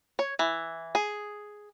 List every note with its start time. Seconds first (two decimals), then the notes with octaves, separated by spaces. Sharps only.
0.19 C#5
0.39 E3
0.95 G#4